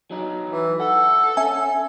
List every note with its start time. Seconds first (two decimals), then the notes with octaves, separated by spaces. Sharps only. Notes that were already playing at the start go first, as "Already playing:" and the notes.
0.11 F#3 D#4
0.50 E3
0.80 A4 F#5
1.37 C#4 E5 G#5